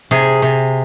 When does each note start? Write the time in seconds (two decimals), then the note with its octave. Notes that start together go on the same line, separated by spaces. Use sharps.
0.11 C3 G#4
0.42 C3